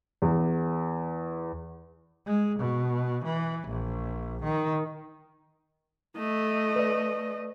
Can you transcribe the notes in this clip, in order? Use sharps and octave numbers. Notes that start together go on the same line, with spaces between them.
E2
G#3
B2
E3
A#1
D#3
A3 D#5
B4 D5